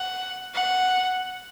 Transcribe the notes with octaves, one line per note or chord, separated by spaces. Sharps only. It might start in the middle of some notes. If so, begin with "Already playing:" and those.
Already playing: F#5
F#5